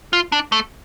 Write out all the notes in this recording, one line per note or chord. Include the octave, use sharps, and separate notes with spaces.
F4
D4
A3